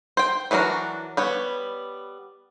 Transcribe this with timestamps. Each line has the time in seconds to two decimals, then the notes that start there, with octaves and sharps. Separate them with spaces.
0.17 C5 G5
0.51 E3 F#3 D4 F#4 A#4
1.17 G3 B3 C#5